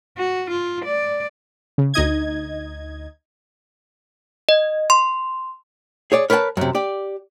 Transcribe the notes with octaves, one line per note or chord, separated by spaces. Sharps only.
F#4
F4
D5
C#3
D2 D#4 D#5 G#6
D#5
C6
G#4 C#5 D5
A#4 B4 C#5 G5 A5
F#2 C3
G4 D5